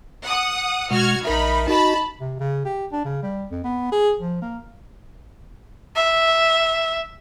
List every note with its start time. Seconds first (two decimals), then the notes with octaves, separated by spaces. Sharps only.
0.22 F#5 D#6
0.91 B2 G#3 F#4 F6 G#6
1.25 A#1 D#4 A#4 E5 B5
1.68 D#4 F#4 D#5 A5 B5
2.20 C3
2.40 C#3
2.65 G4
2.92 D4
3.05 C#3
3.22 G3
3.51 F2
3.64 B3
3.92 G#4
4.20 F3
4.42 A#3
5.96 E5